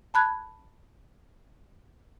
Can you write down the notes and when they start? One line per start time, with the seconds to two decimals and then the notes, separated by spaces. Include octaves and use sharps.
0.14 A5 B5 F#6 G#6